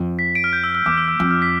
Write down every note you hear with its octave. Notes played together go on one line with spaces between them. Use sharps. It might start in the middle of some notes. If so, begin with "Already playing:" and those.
Already playing: F2
B6
D7
F6
G6
E6
E6
E2 D6
E6
E6
F2 E6
F6
B6